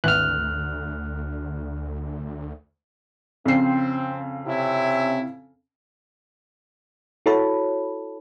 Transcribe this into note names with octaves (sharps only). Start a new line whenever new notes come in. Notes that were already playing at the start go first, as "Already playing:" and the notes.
G#1 D2 E3 F6 F#6
F2 C#3 C4 C7
C3 C#4 E4
E4 F#4 A4 C#5 A5 B5